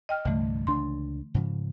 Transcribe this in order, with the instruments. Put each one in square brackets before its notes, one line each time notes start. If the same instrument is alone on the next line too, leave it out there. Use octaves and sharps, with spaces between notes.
[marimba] D#5 G5 F6
[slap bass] C2 G2 [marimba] D3 E3 A3
[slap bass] C#2 D4 [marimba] C6
[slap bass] G#2 C#3 F3